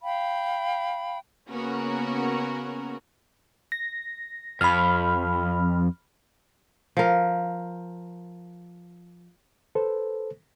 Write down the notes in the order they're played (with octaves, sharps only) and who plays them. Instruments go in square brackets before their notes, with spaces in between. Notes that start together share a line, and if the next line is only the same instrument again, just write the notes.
[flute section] F5 G5 B5
[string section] C#3 A#3 B3 C#4 F#4 A#4
[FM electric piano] A#6
[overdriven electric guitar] F2 [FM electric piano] B5 F6
[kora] F3 A#4
[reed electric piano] A4 B4 C5